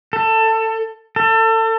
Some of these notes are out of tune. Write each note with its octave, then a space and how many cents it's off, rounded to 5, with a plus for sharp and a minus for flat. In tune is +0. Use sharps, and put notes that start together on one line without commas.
A4 +20
A4 +30